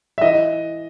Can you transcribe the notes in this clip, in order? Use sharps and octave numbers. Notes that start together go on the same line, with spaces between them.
E5
E3 D#5